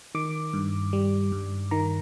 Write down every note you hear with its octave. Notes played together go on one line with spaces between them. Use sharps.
D#3 D6
G2
G3
G2
D#3 A#5